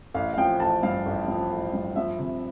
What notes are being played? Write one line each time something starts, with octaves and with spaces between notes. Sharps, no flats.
A1 F5
F5
F3 G5
A1 A5
G2 F5
A1
F3
A1
G2
F3 E5
C3